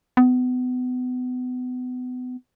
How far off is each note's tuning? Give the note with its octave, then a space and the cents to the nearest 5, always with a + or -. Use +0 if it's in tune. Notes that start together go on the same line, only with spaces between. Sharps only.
B3 +30